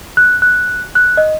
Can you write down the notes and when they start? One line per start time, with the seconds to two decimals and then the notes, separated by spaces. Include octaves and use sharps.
0.17 F#6
0.42 F#6
0.95 F#6
1.17 D#5